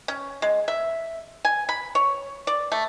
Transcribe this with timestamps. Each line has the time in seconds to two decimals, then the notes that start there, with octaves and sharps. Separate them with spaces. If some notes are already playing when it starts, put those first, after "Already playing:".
0.08 C#4
0.42 G#3
0.68 E5
1.45 G#5
1.69 B5
1.95 C#5
2.47 D5
2.72 A3